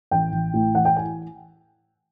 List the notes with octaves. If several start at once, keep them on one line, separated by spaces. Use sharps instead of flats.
A1 G5
A1
A2
E3 F#5
G5
G#5